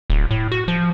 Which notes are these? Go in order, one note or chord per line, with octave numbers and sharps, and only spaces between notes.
D1
A2
F#4
F3